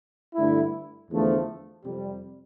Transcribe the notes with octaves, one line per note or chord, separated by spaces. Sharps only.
G2 D3 A3 E4
E2 D3 F3 A3
F2 C3 G3